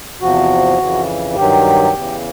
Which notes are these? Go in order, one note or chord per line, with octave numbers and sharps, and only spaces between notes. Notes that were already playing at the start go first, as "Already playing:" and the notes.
E2 C3 F3 F#4
F2 C#3 E3
G2 D#3 F#3 G4
E2 C#3 E3